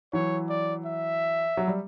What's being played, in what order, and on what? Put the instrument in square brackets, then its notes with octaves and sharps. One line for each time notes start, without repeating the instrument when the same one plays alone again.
[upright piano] E3 F#3 [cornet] C#5
[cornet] D5
E5
[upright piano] F#3
G3